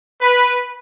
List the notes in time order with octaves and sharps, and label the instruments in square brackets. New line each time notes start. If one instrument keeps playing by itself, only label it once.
[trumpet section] B4